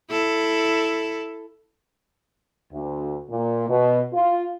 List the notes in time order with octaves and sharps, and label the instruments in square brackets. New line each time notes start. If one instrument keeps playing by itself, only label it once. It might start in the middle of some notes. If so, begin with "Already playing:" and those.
[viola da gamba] E4 A4
[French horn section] D2
A#2
B2
F4